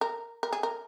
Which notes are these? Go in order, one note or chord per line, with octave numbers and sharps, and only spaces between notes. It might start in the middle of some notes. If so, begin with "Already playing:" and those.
A#4
A#4
G#4
A#4